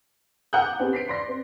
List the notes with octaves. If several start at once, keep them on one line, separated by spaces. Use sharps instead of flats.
F#5 G5 A#5 D#6 F#6 G6
D6
B3 C4 D4 G4 G#4 B4
B6 C7 D7
D5 C6 A#6
C4